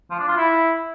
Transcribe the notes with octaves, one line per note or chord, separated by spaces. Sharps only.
F3
D4
F4
E4